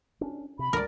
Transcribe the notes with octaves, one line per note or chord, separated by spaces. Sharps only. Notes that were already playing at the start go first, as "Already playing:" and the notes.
C#4 D4
C3 B5
D2 G3 A#4 D5